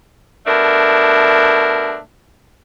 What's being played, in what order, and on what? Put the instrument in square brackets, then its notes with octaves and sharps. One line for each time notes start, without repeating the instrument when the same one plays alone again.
[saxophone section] B2 A3 D4 A#4